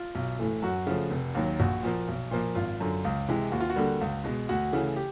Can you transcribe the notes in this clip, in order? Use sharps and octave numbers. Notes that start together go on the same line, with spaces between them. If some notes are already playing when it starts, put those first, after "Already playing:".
Already playing: F4
B1
A2 E3 A3
F#2 F#4
C#3 F3 A3
F1
D#2 D#3 F#3
A#1 F#4
A#2 F3 A#3
B1
A#2 F3 A#3
G#1 F4
F#2 D3
C#2
C3 E3 G#3
D#2 F#4
F4
F#4
D3 G3 A#3
C#2
B2 G#3
D2 F#4
C#3 E3 A3
G4